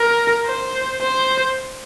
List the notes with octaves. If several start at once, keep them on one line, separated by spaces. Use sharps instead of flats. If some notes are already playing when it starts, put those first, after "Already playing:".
Already playing: A#4
C5
C5